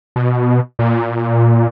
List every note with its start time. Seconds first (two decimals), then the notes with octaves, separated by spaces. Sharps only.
0.16 B2
0.79 A#2